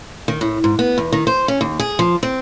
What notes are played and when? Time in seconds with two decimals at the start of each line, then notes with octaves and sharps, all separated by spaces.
0.28 D#3
0.41 A2
0.64 G#2
0.79 B3
0.98 E2
1.12 D#3
1.27 C5
1.48 C#4
1.61 D#2
1.79 G#4
1.99 F3
2.23 C4